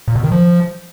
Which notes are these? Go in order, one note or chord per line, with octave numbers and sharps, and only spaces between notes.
A#2
B2
D#3
F3